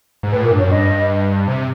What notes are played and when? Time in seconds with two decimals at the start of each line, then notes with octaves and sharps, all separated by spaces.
0.23 G#2
0.32 A2 B4
0.42 A#2 A#4
0.52 G2
0.58 C#5
0.61 F#2
0.70 G2 D#5
1.48 C3